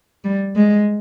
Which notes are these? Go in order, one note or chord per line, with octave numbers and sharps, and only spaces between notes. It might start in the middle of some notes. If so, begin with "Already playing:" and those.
G3
G#3